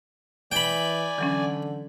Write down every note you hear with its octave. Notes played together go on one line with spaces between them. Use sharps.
E3 D5 G5 G#5 B5
D3 E3 F#3 C#4